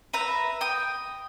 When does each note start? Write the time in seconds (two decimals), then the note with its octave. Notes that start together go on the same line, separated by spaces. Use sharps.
0.13 B4 E5 A#5
0.61 G5 D#6